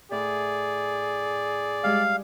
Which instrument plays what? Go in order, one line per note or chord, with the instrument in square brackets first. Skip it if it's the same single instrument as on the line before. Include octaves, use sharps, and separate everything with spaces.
[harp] A2 [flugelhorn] G#4 [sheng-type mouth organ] D5
[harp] G3 G#3 G4 [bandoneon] F5